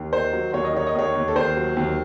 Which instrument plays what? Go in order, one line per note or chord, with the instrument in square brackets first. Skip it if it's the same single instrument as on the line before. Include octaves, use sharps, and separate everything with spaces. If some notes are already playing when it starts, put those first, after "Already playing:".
Already playing: [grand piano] D#2
D#3 C5
F#3
D#2 C#5
D#5
D#3 C#5
D#5
D#2 C#5
D#2
A4
D#2 C5
F#3
D#2